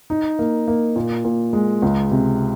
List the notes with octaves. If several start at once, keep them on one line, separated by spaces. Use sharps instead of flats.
D#4
A#3
A#3
A#2
A#2
G#3
C#2
C3